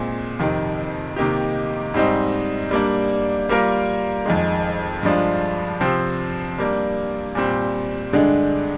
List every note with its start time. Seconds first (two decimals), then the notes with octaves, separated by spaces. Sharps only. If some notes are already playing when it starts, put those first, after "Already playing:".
Already playing: A#2 G#3 C4
0.39 F2 C3 D#3
1.16 C3 D#3 A#3 D#4 G4
1.94 G#2 G3 C4 D#4
2.71 G3 A#3 D4
3.49 G3 A#3 F4 A#4
4.26 F2 D#3 G#3
5.03 G2 F3 G#3 D4 F4
5.81 C3 F3 C4
6.58 G3 A#3 D4
7.35 A#2 G3 C4
8.13 G2 D3 G#3 D4